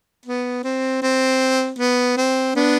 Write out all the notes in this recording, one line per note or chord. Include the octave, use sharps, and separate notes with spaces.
B3
C4
C4
B3
C4
B3 D4